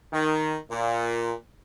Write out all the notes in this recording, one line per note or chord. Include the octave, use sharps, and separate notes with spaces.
D#3
A#2